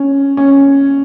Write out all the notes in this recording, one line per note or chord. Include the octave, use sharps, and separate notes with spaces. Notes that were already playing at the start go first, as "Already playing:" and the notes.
Already playing: C#4
C#4